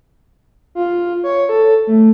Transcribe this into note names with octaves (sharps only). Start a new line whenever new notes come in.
F4
C#5
A4
A3